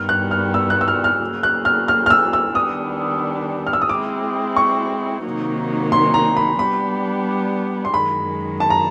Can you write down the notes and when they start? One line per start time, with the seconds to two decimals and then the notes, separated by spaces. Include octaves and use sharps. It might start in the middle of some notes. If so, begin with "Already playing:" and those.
Already playing: G2 D#3 G3 B3 F6
0.09 F#6
0.31 F6
0.54 E6
0.70 F#6
0.81 E6
0.88 F6
1.04 F6
1.20 C#3 F#3 A#3
1.43 F#6
1.65 F6
1.88 F6
2.06 F6
2.10 E6
2.33 E6
2.55 D#3 G3 B3 D4 D#6
3.67 F6
3.73 E6
3.82 D#6
3.89 G#3 C4 E4 D6
4.56 C#6
5.24 C3 D#3 F#3 A#3 D#4
5.92 C6
6.14 A#5
6.37 B5
6.58 G3 B3 D4 G4 B5
7.85 C6
7.93 F#2 D#3 G#3 B5
8.60 A5
8.70 A#5